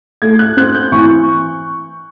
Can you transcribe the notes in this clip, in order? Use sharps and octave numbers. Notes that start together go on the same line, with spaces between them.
A3 G#6
F#6
C4 F#6
G6
E3 C#6